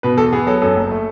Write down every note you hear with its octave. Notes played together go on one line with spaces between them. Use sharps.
B2 B4
E2 A4
B3 G#4
F#3 A4
F#2 A4
F#1
A3